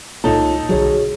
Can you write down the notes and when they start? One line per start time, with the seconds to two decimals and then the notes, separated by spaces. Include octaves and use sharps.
0.24 C#2 A#2 A#3 D#4 F4 A4 C#5
0.69 B1 D3 F#3 F#4 G#4 C#5